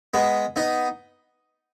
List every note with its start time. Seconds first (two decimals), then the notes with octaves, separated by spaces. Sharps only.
0.14 G#3 B3
0.56 B3 D#4